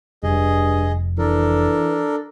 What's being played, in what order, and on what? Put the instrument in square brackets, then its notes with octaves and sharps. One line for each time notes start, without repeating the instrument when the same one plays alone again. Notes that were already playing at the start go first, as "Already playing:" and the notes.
[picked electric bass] F1 [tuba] G2 [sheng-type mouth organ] G#4 D#5
[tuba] E3 [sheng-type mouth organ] D4 A4 A#4